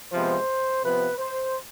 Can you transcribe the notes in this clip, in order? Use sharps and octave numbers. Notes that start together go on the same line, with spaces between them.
C3 F3 G#3 B3 C5
C3 F3 B3 B4
C5